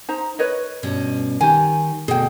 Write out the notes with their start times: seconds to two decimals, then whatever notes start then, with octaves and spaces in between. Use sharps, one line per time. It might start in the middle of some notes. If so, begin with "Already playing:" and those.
0.09 D#4 C5 A#5
0.39 B4 C#5 D#5
0.83 G2 B2 C#4
1.41 D#3 G4 G#5
2.08 D2 B2 G#4 G5